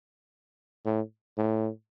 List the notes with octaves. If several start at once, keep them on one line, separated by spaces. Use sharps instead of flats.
A2
A2